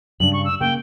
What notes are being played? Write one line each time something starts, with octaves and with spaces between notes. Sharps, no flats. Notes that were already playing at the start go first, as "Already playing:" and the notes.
G2 C#3 D4 F#7
C#6
E6
C#3 A#3 G5